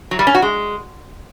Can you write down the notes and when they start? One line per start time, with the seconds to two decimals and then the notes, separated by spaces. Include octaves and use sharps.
0.11 F#3
0.19 G3
0.27 C#4
0.35 F#4
0.42 G#3